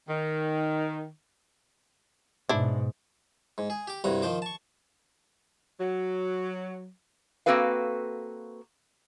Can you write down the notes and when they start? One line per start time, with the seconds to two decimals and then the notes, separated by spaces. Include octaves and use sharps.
0.08 D#3
2.49 G#2 B2 D4 E4
3.58 G#2
3.70 G#4
3.87 G4 D6
4.04 C2 G2 C3 F#4 A#5
4.22 D#3 F3 C5 D6
4.42 A5 C#6
5.80 F#3
7.46 A#3 C4 F#4 A4 B4 F5